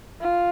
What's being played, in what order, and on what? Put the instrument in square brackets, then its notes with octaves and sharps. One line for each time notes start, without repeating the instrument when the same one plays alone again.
[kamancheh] F4